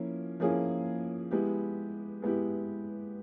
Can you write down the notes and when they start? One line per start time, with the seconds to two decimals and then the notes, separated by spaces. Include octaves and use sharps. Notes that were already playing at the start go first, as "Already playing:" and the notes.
Already playing: F3 A#3 C#4 E4
0.40 F3 A#3 C#4 E4 G#4
1.31 G#3 B3 E4 G4
2.22 G#3 B3 E4 G4